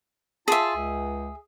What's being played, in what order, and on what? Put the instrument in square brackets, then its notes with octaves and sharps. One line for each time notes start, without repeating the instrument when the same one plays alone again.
[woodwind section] F4 A5 [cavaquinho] G#4 E5
[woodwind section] C#2